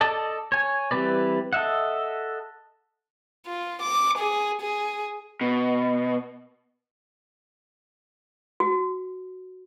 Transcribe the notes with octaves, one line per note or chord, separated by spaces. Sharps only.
A4 D5 D#5 A5
C#5 G#5
E3 G3 C4 B4 D5
A4 D#5 E5 F#5
F4
D6
G#4
G#4
B2
F#4